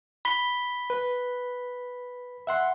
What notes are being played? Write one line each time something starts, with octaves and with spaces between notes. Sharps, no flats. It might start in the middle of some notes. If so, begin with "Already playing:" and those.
B5 B6 G7
B4
E5 F#5 C6